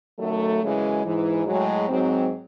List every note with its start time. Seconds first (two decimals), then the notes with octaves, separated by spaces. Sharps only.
0.19 F#2 D#3 F#3 A3
0.62 F#2 C#3 E3 G#3
1.04 G#2 E3
1.46 A2 F#3 G#3
1.88 G#2 F#3 C4